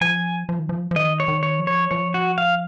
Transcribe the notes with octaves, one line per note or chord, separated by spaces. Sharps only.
F3 G#5
F3
D#3
F3
F3
D#3 D#5
C#5
D#3
C#5
F3
C#5
F3 C#5
F#4
F5